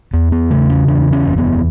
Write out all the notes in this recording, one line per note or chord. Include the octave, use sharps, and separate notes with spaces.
E2 B3
B3
C#3 A3
C#4
E2 D4
C#4
F#1
B3